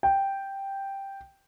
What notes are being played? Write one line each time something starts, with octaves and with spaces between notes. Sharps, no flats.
G5